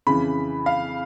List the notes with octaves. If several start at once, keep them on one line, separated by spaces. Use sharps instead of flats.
F2 C#3 E3 B5
F5